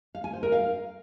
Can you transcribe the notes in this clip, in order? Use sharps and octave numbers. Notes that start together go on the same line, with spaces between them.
F5
G#5
C5
A#4
F5